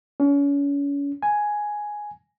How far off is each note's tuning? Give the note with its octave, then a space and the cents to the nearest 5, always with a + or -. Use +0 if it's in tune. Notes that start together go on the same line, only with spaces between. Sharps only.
C#4 +35
G#5 +5